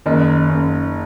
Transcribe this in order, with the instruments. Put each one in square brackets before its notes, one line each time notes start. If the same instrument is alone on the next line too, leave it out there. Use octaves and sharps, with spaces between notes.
[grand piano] F#1 [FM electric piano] D#3 D#4
[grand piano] F#1